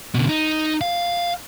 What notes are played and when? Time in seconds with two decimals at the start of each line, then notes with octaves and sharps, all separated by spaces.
0.14 B2 D3
0.29 D#4
0.81 F5